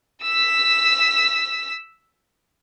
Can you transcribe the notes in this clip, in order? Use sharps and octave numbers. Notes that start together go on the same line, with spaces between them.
E6 B6